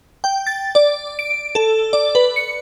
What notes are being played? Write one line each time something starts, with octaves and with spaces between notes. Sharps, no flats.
G5
A6
D5
D7
A4
D5
B4
C#7